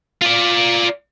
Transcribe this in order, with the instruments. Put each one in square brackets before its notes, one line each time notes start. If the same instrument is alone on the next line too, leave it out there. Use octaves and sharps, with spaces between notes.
[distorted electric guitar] F4 D5